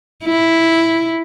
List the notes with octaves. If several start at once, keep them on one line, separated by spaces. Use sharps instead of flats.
E4